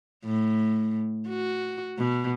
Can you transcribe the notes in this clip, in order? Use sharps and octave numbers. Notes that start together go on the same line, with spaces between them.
A2
F#4
B2